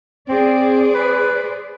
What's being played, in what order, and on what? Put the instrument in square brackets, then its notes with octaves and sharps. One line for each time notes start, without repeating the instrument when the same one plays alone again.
[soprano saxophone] C4 [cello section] G#4 C5 D5
[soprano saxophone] B4